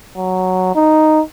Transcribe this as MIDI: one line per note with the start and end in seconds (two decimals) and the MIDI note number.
0.17 0.74 54
0.75 1.21 63